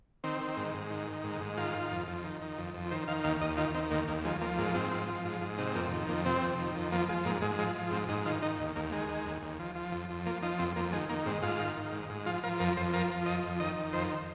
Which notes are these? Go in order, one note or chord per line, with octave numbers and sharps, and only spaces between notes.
D#3 C4
D#3
G#2
G#2
D#3
D#3
G#2
G#2
D#3 F4
D#3
F2
F2
D#3
D#3
F2
F2
D#3 C5
D#3 F5
D#2 F5
D#2 D#5
D#3 F4
D#3 C4
D#2 A#3
D#2 A#3
F3 G#3
F3 A#3
G#2 A#3
G#2 C4
F3
F3
G#2
G#2
C3 D#4
F2 A#3
D#3
F2 A#3
C3 C4
F2
D#3
F2
F3 A#3
F3 G#3
G#2 A#3
G#2 G#3
F3 G#3
F3
G#2 C4
G#2 D#4
D#3 F4
D#3 D#4
D#2
D#2 A#3
D#3 G#3
D#3
D#2
D#2
F3
F3
F2
F2
F3 A#3
F3 D#4
F2 C4
F2 A#3
D#3 G#3
D#3 A#3
G#2 C4
G#2 F4
D#3
D#3
G#2
G#2
F3 F4
F3 A#4
F2 A#4
F2 C5
F3 A#4
F3
F2 D#5
F2
D#3 D#5
D#3
F2 C5